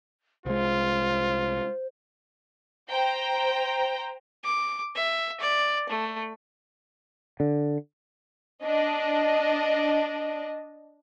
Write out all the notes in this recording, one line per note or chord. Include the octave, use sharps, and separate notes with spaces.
C2 G#3 F4 C5
C5 G5 A#5
D6
E5
D5
A3
D3
D4 D#5